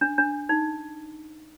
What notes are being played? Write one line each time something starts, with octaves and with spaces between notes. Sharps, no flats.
D4
D4
D#4